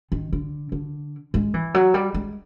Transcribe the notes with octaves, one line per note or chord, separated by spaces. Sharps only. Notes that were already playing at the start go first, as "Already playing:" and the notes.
D#3
D3
D3
G#3
E3
F#3
G3
G#3